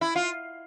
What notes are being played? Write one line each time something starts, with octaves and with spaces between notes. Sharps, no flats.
E4
F4